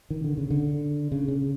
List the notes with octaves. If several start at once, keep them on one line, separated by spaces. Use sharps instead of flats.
D#3
D3
C#3
D3
C#3
C#3